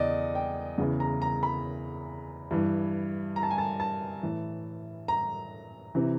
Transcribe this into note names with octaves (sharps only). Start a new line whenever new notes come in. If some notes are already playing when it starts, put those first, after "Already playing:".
Already playing: E2 C#3 D5 D#5
G5
E2 C#3 E3
A#5
A#5
B5
G2 E3
A#5
A5
G#5
A5
A5
A2 E3
A#5
C3 E3